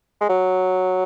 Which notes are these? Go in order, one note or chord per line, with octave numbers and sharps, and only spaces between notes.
G#3
F#3